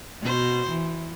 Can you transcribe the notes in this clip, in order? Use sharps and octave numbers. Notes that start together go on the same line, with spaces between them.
B2 F#4 C5
E3